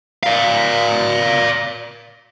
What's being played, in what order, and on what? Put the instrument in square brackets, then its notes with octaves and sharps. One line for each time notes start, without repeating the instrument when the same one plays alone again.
[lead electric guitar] D5 F5